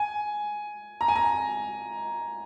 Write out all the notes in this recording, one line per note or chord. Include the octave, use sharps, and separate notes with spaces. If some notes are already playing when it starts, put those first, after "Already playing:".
Already playing: G#5
A#5
G#5
A#5